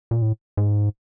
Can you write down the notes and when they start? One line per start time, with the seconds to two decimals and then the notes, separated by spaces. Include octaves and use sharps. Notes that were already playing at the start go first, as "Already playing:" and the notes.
0.11 A#2
0.22 A2
0.57 G#2